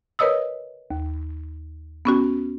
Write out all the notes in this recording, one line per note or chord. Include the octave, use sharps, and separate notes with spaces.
A#4 B4 C#5 D#5 D#6 E6
D#2
B3 C#4 F#4